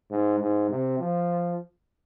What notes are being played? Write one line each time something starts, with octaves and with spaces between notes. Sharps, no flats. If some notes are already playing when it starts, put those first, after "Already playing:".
G#2
G#2
C3
F3